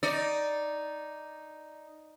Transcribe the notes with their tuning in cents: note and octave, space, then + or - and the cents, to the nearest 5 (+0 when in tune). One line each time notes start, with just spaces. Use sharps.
D#4 +0 D5 +0